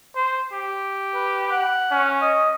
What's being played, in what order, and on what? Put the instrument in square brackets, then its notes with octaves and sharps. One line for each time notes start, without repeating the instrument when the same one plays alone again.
[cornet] C5
G4
[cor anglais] B4
F#5
[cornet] C#4
[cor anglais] D#5